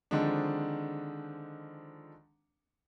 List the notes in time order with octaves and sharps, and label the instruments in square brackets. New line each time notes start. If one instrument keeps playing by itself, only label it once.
[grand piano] D3 D#3 F3 G#3 C4 D4